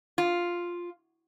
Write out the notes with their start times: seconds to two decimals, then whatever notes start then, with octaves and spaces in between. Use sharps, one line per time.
0.18 F4